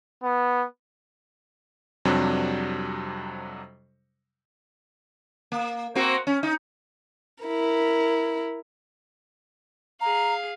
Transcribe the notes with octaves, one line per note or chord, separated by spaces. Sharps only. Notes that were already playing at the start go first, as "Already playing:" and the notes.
B3
F2 C3 F#3 G3 D4
A#3
A#3 C4 F#4
C#4
D#4
E4 A#4
G#4 F5 A#5